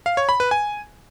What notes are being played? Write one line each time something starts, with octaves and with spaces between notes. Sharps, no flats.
F5
C#5
B5
B4
G#5